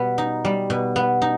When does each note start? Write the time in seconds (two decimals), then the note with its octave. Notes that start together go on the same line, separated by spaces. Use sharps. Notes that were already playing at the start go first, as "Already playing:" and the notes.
Already playing: B2 G3 B3
0.18 D#4
0.45 G3
0.70 B2
0.96 B3
1.22 D#4